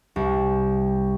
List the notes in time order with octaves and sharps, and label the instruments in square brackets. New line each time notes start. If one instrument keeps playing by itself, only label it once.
[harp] C2